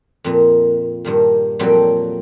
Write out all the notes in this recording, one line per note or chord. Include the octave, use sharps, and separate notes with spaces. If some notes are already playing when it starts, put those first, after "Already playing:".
F2 A#2
G2 A#2 D#3
F2 A#2 F#3 G3 A4 G5